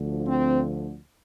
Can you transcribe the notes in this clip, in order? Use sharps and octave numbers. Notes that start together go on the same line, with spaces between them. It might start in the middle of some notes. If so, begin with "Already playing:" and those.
Already playing: D2 D3 F3
C4